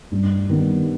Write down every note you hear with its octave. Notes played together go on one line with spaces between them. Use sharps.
G2
D#3 G3 B3